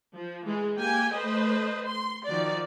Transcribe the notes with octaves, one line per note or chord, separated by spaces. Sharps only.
F3
E3 G#3 G#4
A#3 G4 G5 G#5
A3 B4 C5 D#5
C6
D#3 F3 F#4 D5